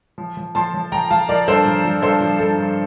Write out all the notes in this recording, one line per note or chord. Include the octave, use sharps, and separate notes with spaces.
F3
F3
F3 A5 C6
F3
F3 G5 A#5
F3 F5 A5
F3 A#4 D5
G2 A4 C5
F3
F3
G2 A4 C5
F3
G2 A4
G2